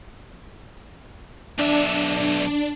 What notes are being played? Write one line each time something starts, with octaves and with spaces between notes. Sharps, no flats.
B1 D4 E5